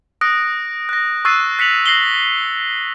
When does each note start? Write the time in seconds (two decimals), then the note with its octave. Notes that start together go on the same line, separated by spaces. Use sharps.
0.21 D#6 F#6 A#6 D7
0.89 F#6 A#6
1.25 C#6 E6 F#6 A6 C7 D#7
1.59 F#6 B6 C#7 F7 F#7
1.86 F#6 A#6 C7 F#7 G7